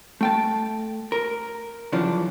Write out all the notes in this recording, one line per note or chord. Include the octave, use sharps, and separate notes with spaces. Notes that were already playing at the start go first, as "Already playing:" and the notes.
A3 G5 A5
A#4
F#2 C#3 E3 F3 D4